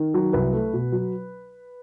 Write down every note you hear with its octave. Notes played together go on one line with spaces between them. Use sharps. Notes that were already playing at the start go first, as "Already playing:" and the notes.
Already playing: D#3
F#3
C2 B4
A3
B2
F#3